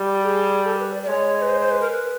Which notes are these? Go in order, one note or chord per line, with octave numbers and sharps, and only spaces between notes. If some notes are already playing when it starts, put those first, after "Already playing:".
Already playing: G3
G4
G#4
A4
A#4
B4
D5
D5
G#3 C#5
B4
C5
C5
B4
A#4
B4